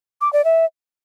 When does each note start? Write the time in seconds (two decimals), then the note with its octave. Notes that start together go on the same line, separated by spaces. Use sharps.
0.21 D6
0.33 D5
0.45 E5